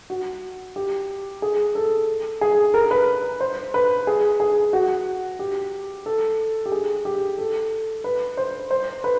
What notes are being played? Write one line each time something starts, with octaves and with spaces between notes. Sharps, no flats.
F#4
G4
G#4
A4
G#4
A#4
B4
C5
B4
G#4
G#4
F#4
G4
A4
G4
G#4
G4
A4
B4
C5
C5
B4